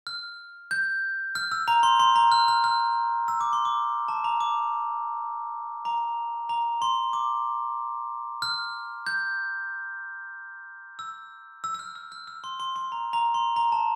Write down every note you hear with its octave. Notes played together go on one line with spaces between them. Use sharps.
F6
G6
F6
E6
A#5
C6
C6
A#5
F6
F6
F6
E6
D6
C6
D6
A5
A#5
D6
A#5
A#5
C6
D6
F6
G6
E6
E6
E6
F6
E6
F6
E6
C6
C6
C6
A#5
A#5
C6
A#5
A5